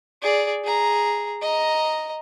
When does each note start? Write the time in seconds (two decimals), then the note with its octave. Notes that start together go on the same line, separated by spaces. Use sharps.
0.22 G#4 D5
0.64 G#4 A#5
1.42 D#5 A#5